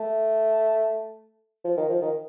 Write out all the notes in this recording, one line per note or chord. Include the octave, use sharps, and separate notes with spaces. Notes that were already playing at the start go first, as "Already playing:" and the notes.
Already playing: A3
F3
D#3
F3
D#3